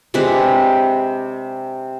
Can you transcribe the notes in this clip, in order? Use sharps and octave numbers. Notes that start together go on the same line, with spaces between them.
C3 G#3 D4 B4